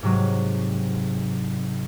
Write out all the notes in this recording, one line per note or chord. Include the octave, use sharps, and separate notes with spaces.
G#2 C3 F#3